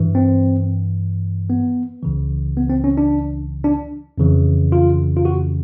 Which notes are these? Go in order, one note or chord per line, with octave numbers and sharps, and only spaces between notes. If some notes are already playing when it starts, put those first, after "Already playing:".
Already playing: G2 E3
C4
B3
C#2 C#3 E3
B3
C4
C#4
D4
D4
F2 C#3 E3
F4
F4
F#4